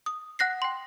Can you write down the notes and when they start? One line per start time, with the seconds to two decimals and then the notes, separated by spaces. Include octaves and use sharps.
0.06 D#6
0.39 F#5 F#6 A#6 C7
0.62 G5 C6